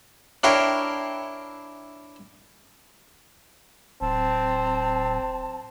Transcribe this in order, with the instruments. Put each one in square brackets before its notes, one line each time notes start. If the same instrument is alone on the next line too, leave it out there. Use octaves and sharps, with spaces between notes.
[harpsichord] D4 E4 A#4 C#5 F5 G5
[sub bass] D1 [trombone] C4 [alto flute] A5